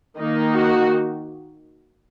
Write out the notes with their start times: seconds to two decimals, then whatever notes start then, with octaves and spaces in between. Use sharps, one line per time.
0.18 D#3 A#3 D#4
0.54 F#4